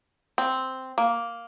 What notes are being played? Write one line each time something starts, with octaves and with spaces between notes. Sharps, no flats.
C4
A#3